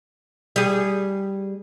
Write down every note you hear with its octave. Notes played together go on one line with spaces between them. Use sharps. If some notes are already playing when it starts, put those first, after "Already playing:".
G3 G#4